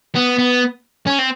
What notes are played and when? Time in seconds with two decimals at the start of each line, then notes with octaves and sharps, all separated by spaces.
0.15 B3
0.38 B3
1.07 C#4
1.19 C4